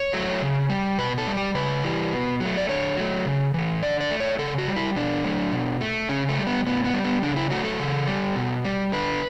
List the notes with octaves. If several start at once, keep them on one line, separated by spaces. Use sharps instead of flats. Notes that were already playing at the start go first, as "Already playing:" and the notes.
Already playing: C#5
F#3 A3
C#3
G3
B2 B4
A4
G3
G4
C#3 B4
E3 G3
B2
F#3
A3
D5
D3 C#5
F#3 A3
C#3
E3 A3
D3 D5
D5
A3
C#5
C#3 A4
F#4
G3
E4
B2 D4
F#3 A3
B2
A3
C#3 C#4
A3
G3
B3
A2 B3
B3
G3
B3
C#3 D4
E4
F#3 A3 F#4
A4
C#3
G3
B2
G3
D3 B4